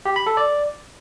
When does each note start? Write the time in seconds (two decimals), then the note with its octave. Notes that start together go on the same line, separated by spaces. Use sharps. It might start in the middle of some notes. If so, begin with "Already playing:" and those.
0.05 G4
0.16 B5
0.27 A4
0.37 D5